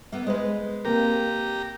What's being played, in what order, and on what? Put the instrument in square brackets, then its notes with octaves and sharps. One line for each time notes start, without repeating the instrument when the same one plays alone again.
[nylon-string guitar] A#3 B3 [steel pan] E5
[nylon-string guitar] G#3 B4 [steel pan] G#4 C5 D#5
[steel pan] A#3 C4 A#4 [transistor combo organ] G4 A#5